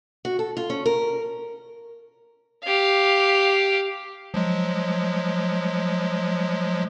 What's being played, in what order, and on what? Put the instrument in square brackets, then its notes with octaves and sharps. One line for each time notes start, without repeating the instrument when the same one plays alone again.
[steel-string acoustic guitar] F#4
A4
F4
C#4
A#4
[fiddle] G4 F5
[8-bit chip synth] F3 F#3 G#3